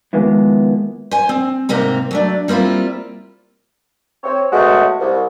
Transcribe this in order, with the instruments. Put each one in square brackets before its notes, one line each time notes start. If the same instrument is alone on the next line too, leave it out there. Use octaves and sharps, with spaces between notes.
[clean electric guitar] D#3 F3 G#3 A#3 B3 E4
[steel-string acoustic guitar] C5 G#5
C4
G#2 C3 A#3 C4 A#5
F#3 A3 D4
G3 A#3 C4 E4 F4
[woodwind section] C4 C#5
B2 G#3 A3 C#4 F#4
C2